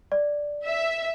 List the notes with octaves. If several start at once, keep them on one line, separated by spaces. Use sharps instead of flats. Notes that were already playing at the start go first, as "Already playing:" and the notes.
D5
E5